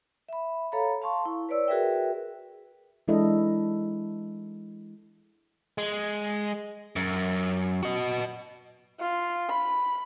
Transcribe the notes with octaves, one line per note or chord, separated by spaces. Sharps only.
E5 B5
A4 C#5 F5 A#5 B5
F5 A5 C6 C#6
E4
B4 C#5 D5 E6
F#4 G#4 A#4 B4 E5 G5
E3 G#3 D4 E4 A4 D#5
G#3
F#2
F#4 D#5
F4
B5